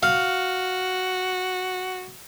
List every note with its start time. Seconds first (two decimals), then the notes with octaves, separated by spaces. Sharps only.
0.03 F#4 F5